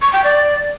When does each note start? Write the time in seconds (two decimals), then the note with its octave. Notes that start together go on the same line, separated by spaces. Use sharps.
0.02 C#6
0.13 G5
0.24 D5